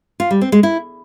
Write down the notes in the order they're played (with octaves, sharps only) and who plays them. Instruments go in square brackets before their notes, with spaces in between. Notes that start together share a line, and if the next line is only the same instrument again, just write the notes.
[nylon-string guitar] F4
G3
C4
G#3
E4